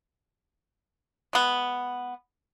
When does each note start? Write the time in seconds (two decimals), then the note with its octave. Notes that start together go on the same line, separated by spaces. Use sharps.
1.33 G#3 B3